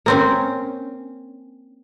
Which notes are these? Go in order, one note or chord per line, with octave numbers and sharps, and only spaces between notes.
A#3 C4 C#4